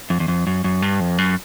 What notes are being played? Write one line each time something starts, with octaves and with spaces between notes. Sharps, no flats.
F2
E2
F2
F#2
F#2
G2
F2
F#2